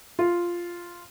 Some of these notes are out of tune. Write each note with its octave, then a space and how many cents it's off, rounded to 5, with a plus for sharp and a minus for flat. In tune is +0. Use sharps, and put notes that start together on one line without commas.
F4 -5